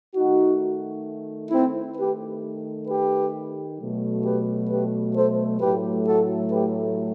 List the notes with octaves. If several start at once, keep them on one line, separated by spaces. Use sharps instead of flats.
D#3 A3 D#4 F#4
C4 E4
D#3 A3 G4 B4
G4 B4
B2 F#3 A3
G4 B4
G4 B4
A4 C5
A2 F#3 A3 G4 B4
F#4 A4
G4 B4